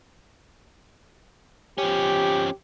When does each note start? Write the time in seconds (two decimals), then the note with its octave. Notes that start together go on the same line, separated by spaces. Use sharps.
1.78 F3 C#4 G4